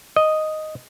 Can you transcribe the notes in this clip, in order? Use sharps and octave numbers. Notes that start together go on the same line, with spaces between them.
D#5